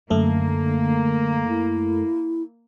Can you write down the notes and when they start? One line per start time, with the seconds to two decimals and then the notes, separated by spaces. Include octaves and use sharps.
0.10 F#2 D3 A3 A#3 A4
1.48 E4